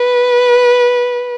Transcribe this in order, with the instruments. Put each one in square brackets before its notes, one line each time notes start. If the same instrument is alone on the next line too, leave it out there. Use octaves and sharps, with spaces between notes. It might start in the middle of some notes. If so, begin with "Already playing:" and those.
Already playing: [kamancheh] B4